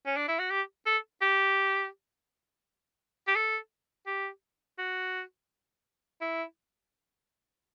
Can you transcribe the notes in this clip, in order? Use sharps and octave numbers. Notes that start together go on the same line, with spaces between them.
C#4
D4
E4
F#4
G4
A4
G4
G4
A4
G4
F#4
E4